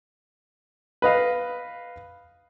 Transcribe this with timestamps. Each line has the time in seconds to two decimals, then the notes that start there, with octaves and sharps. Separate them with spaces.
1.02 B4 D#5 F5